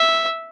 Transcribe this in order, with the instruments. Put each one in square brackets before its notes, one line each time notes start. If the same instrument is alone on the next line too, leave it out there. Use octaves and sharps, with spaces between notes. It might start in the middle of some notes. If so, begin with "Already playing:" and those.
Already playing: [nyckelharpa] E5